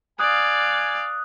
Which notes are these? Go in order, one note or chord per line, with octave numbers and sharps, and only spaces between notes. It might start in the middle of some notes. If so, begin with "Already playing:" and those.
D5 F5 G#5 D#6 F#6